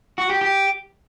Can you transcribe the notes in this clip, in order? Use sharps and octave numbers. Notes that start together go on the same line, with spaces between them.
F#4
G4
G4